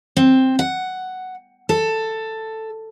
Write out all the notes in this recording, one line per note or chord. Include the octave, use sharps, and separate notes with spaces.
C4
F#5
A4